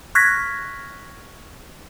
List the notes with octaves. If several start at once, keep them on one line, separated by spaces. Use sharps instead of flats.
C#6 F6 F#6 G#6 A#6 B6